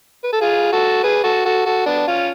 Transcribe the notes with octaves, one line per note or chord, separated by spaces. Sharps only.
B4
A4
F4 G#4
F#4 A4
G#4 B4
F#4 A4
F#4 A4
F#4 A4
B3 D4
C#4 F4